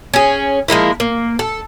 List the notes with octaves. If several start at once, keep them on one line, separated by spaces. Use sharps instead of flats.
C#4 G#4
F3 G#3 A#3 E4
A#3
A4